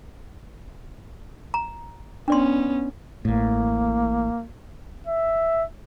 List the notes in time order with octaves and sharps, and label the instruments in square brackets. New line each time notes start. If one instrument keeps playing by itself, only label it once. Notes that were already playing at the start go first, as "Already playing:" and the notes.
[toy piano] A#5
[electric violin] B3 C#4 [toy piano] D4 D5 C6
[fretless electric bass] A1 A2 [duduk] A#3
[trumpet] E5